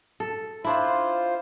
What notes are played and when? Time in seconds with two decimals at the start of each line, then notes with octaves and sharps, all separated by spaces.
0.20 A4
0.65 D4 E4 F4 C5